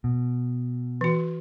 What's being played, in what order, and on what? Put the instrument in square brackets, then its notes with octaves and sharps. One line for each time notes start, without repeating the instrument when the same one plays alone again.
[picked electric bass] B2
[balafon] E3 F#4